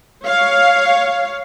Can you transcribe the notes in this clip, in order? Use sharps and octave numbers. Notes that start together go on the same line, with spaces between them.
C#5 F5